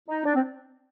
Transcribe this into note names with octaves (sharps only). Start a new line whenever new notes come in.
D#4
D4
C4